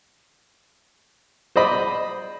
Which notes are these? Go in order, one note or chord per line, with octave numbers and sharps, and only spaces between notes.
C5 D5 D#5 B5